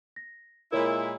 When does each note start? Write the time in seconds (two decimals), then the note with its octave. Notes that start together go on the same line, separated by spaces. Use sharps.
0.16 A#6
0.72 A#2 G#3 E4 A#4 C#5